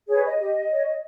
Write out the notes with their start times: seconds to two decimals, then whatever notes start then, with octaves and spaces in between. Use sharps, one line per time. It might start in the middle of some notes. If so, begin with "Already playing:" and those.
0.08 G#4 B4 C#5
0.24 D#5
0.39 G4
0.70 C#5